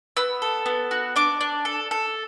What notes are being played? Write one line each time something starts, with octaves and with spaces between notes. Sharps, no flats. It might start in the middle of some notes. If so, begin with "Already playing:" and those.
B3 E6
A4
B3
F#4
D4 D6
D4
A4
A4